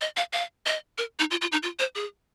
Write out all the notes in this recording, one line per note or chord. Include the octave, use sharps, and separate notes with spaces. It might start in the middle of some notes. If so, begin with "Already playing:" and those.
D#5
F5
F5
D#5
A#4
D#4
F4
F4
D#4
F4
C5
G#4